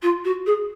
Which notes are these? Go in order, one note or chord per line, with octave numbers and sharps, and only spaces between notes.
F4
F#4
G#4